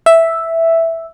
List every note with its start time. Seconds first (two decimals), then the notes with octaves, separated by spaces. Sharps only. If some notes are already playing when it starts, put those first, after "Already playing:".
0.06 E5